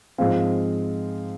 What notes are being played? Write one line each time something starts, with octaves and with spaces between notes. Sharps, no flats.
G#2 F3 G#3 C4 F5